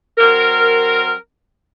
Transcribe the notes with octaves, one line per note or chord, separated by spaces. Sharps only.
F#3 C4 A#4